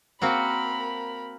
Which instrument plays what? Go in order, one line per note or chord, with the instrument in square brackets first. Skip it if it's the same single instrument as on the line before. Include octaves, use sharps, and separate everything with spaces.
[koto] A#3 C4 F#4 [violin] A#4 B5